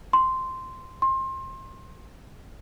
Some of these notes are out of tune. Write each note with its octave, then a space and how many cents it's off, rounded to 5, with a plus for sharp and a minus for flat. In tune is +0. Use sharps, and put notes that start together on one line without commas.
C6 -5
C6 +25